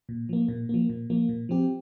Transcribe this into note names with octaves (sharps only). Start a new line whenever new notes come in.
A#2
F3 A#3
A#2
F3 A#3
A#2
F3 A#3
A#2
F3 C4 G4